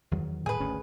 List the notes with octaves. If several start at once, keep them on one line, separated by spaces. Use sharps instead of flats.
E2 D#3 F#3
A2 G#4 B4
G#1 D2 C#4